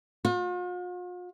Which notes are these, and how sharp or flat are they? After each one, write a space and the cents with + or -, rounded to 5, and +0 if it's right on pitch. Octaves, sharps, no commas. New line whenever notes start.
F4 +45